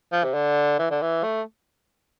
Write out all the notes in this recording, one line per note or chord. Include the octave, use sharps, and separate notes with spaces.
F3
C3
D3
E3
D3
E3
A3